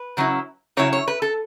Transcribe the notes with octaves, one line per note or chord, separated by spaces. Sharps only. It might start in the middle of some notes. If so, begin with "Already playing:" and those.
Already playing: B4
C#3 F#3 C#4 E4
C#3 F#3 C#4 E4 C#5
C#5
B4
A4